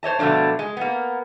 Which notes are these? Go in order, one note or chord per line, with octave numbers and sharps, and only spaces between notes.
C5 C#5 D#5 A5
B2 D3 F3 A3 D4
G#3
A#3 B3